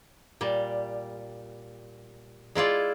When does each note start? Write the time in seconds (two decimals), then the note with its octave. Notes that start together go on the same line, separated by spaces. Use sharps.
0.41 A#2 G3
2.55 G#3 E4 F4 D5